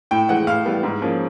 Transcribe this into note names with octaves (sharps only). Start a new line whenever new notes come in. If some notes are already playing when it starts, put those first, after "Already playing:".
A2 G5
E3 G#3 F#5
A2 F5
E3 G3 B3
G#2
F3 A#3 C#4